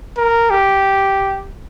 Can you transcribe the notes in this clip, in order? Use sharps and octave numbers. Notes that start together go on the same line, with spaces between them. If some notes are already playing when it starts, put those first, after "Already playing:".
A#4
G4